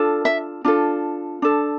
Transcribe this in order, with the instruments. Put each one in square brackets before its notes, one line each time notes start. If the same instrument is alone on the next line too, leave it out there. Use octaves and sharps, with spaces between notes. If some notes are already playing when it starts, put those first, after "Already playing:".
Already playing: [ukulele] D4 F4 A4
E5
D4 F4 A4
D4 A4